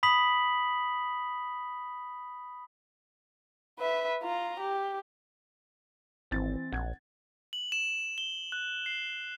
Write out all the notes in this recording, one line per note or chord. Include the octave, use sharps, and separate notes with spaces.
B5 D#6 B6 F#7
B4 E5
F4 A#5
G4
G#1 E3 C4 A6
A#1 F#5 G#6
F#7
E7
G7
F#6
C7